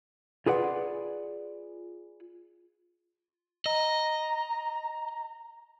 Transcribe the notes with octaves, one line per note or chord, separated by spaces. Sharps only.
F4 G#4 B4 D5 F#5
D#5 A#5